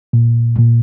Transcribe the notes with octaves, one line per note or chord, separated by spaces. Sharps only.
A#2
A#2